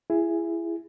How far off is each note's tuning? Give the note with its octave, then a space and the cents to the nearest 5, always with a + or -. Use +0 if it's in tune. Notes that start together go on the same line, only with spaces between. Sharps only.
E4 +25 G#4 -5